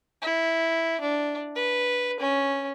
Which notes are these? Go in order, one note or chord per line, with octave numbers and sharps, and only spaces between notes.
E4
D4
B4
C#4